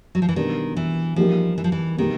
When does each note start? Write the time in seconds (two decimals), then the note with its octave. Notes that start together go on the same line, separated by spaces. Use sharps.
0.15 F#3
0.22 F3
0.29 E3
0.36 B2 D#3 G3 B3 D4
0.77 E3
1.16 F3 G3 A#3 D#4 G4 A#4
1.58 E3
1.64 F3
1.72 E3
1.97 B2 D#3 G3 A#3 D#4 G4